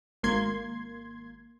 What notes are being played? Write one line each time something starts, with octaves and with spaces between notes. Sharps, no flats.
G#1 A#3 C6 G#6